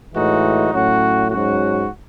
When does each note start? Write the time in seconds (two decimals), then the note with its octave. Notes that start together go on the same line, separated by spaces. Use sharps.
0.13 A2 E3 G#3 D#4 F#4
0.71 A2 F#3 C#4 F#4
1.30 G#2 F#3 C#4 F#4